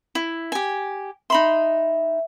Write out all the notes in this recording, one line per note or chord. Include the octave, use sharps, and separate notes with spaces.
E4
G4 G#5
D#4 E5 B5 C6